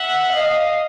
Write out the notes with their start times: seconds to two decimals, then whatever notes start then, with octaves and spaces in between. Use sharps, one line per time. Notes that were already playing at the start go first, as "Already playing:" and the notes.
Already playing: E5 F#5
0.33 D#5 F5